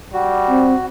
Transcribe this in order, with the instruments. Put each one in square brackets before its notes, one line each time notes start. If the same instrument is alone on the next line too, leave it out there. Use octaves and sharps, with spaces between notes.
[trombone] G3 [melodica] F#4
[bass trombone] C4